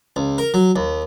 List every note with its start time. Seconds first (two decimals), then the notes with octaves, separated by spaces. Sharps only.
0.16 C#2
0.38 A#4
0.54 F#3
0.76 D#2